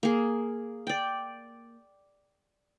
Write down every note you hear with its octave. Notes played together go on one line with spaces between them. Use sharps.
A#3 G#4
D5 G5